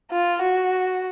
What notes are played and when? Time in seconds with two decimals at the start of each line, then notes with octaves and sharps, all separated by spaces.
0.11 F4
0.42 F#4